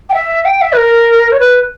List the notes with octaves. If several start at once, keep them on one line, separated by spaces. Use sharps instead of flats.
G5
E5
G5
E5
B4
A#4
C#5
B4